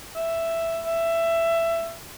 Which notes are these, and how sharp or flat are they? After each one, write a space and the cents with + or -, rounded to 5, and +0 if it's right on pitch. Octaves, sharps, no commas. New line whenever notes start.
E5 +5
E5 +15